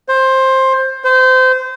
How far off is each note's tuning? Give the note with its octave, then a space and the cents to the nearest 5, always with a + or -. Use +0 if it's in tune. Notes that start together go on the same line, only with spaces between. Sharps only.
C5 +15
C5 -25